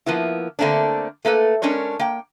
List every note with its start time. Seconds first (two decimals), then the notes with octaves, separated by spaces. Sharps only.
0.06 F3 A#3 B3 E4
0.59 D3 A3 A#3 C4 D4
1.25 A3 A#3 A4 B4
1.62 G#3 C#4 D4 A#4 C#5
1.99 A#3 G5